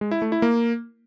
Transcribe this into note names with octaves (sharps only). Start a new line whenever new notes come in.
G#3
E4
A3
E4
A#3